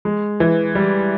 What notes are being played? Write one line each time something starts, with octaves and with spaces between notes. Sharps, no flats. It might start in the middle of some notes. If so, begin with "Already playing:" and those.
G#3
E3
G3